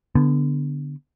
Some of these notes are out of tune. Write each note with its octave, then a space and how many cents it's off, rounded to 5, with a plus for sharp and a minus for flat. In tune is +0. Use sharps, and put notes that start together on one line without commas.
D3 -5 B3 +0